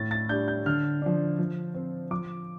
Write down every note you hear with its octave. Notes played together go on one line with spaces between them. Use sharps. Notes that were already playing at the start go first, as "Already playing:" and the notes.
Already playing: A2 A6
A6
G3 D4 G6
G6
D3 F6
F3 D4
F3
C4
F3 D6